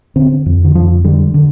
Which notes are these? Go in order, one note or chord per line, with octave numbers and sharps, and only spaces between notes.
D3 C4
F2
D3
F2 F3
D3 G3
D3